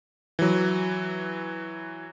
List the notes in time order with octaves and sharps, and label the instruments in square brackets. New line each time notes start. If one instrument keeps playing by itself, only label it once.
[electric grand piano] E3 F#3